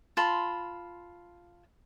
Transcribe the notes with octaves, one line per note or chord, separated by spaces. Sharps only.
F4 A5 B5 C6